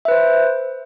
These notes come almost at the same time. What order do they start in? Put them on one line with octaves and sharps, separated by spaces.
E5 B4 C5